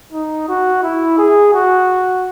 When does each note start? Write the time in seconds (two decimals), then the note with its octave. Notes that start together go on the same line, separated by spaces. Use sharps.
0.13 D#4
0.49 F#4
0.83 E4
1.18 G#4
1.54 F#4